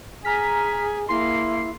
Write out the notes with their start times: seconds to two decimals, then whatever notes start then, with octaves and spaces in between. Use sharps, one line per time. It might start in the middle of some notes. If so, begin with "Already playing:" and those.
0.25 G#4 G#5 A#5 F6 B6
1.09 A#3 E4 C6 C7